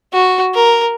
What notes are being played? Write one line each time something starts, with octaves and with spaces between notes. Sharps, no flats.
F#4
A#4